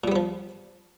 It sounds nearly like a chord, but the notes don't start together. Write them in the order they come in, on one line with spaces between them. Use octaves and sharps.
A#2 G3 B3 F3